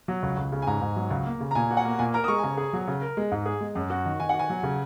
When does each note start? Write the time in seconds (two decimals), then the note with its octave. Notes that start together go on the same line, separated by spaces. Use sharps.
0.08 F#3
0.23 C#2
0.37 C#2
0.52 C#3
0.62 G#5
0.67 G#2 A#5
0.81 G#2
0.96 F#3
1.10 C#2
1.26 A#3
1.40 C#3
1.51 A#5
1.55 A#2 G#5
1.70 F#4
1.77 F#5
1.85 A#3
1.99 A#2 G#5
2.14 A#4 A#5
2.24 D#6
2.28 G#3 C#6
2.38 G#5
2.43 C#3 A#5
2.57 G#4
2.73 F#3
2.87 C#3
3.02 A#4
3.17 G#3
3.31 G#2
3.46 G#4
3.61 G#3
3.75 F#2
3.90 F#4
4.05 D#3
4.20 D#3 G#5
4.29 F#4 F#5
4.39 G#5
4.50 F#3
4.63 C#3